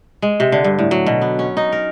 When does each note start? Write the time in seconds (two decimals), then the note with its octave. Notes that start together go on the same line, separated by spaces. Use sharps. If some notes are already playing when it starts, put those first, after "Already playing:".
0.22 G#3
0.40 C3
0.52 D3
0.64 G2
0.79 A2
0.91 F#3
1.06 B2
1.21 B3
1.39 C#4
1.57 D#4
1.72 A#4